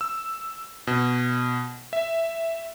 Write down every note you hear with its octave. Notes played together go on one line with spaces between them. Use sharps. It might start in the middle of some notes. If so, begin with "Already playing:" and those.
E6
B2
E5